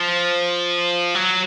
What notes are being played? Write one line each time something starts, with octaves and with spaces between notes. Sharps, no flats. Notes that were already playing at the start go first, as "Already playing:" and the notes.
Already playing: F3
F#3